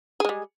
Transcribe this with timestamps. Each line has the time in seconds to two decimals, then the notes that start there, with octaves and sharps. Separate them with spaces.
0.20 G#4
0.25 G#3
0.29 G3